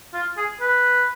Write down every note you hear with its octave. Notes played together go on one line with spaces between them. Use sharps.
F4
G#4
B4